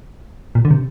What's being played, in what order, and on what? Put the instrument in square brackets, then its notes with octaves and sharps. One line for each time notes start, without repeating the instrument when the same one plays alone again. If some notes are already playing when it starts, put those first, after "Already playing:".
[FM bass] A#2
D3
C3